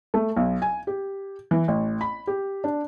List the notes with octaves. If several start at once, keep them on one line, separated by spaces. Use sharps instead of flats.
A3
B1
G#5
G4
E3
A1
B5
G4
D4